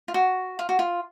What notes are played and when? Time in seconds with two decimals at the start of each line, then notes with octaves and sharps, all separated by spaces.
0.08 F4
0.14 F#4
0.59 F4
0.69 F#4
0.79 F4